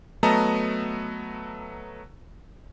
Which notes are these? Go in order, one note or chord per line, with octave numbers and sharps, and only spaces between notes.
F#3 A3 B3 D#5 A5 A#5